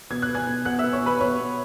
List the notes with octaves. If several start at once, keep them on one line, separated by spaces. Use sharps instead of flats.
B2 G#6
F#6
B3
G#5 G#6
B2
B2 F#5 F#6
B3 E5 E6
C#5 C#6
B2 B4 B5
B2 C#5 C#6
B2